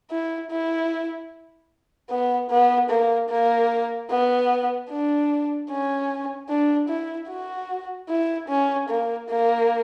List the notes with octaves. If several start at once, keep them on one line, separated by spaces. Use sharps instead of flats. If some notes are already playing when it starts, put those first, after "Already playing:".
E4
E4
B3
B3
A#3
A#3
B3
D4
C#4
D4
E4
F#4
E4
C#4
A#3
A#3